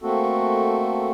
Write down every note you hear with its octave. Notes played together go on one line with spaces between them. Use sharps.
A3 A#3 C4 F#4 A4